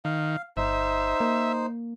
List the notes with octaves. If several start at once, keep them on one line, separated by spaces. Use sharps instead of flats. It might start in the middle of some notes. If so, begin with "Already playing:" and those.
D#3 F5
G1 D#4 C5 E5
A#3